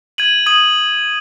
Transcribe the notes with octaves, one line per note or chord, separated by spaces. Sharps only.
G#6 D#7 F#7
D#6 G#6 D#7 F#7